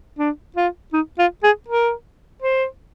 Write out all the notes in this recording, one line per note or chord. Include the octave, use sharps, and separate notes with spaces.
D4
F4
D#4
F4
G#4
A#4
C5